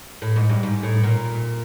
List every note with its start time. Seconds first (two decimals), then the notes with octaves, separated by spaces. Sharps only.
0.22 A2
0.36 G#2
0.50 G2
0.63 G#2
0.83 A2
1.03 A#2